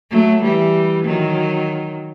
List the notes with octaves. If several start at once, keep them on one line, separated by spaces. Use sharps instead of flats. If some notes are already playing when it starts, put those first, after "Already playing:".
F#3 A3
E3 G3
D#3 F#3